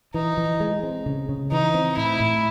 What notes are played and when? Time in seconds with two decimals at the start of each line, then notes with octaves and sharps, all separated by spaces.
0.14 E3 D#4
0.37 E3
0.60 G#3
0.83 C4
1.06 C#3
1.29 C#3
1.51 E3 D#4
1.74 C4
1.97 A2 E4
2.20 A2